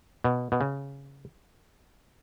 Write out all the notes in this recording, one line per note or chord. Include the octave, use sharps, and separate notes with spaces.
B2
B2
C#3